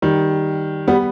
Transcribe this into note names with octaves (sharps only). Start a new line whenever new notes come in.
D#3 G3
G3 B3